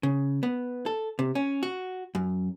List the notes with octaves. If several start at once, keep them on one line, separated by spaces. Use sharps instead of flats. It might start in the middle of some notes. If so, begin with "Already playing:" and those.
C#3
B3
A4
C3
C#4
F#4
F#2